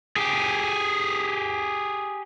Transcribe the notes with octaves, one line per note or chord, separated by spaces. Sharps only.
G4 G#4